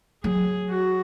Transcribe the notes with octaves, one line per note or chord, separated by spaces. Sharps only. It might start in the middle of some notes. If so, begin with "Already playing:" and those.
F#3 G#4
F#4